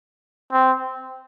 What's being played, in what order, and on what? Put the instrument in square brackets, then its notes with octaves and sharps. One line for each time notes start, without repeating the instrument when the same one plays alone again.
[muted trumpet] C4